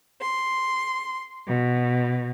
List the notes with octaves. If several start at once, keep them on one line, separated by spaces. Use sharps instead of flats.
C6
B2